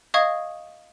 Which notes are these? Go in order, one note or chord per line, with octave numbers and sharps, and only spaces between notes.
D#5 F5 C#6 D#6 G#6